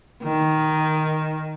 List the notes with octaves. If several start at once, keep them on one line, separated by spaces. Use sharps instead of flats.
D#3